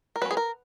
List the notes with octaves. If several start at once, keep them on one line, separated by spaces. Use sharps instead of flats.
A#4
F#3 A#3 C#4 B4
G#4
A#4